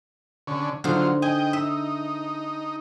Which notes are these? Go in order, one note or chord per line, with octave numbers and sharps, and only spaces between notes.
D3 C#4
D3 F#3 D#4 F4 C5
D#5 G5 G#5
D#4 E5